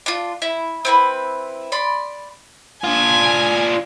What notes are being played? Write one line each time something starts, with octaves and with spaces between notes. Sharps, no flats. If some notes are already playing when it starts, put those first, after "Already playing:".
D4 F4
E4
C4 E4 B4
D5 B5 C6
D4 F4 G#5